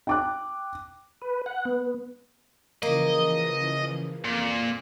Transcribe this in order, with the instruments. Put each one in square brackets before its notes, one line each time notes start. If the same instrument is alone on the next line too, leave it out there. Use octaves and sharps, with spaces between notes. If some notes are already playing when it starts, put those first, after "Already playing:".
[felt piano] G5 D6 F#6
[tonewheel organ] B4
F#5
B3
[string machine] C#3 E3 F3 [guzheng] A#3 [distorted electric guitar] D#5
[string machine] F2 [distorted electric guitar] A#2